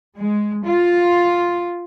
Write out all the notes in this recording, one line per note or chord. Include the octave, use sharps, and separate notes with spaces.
G#3
F4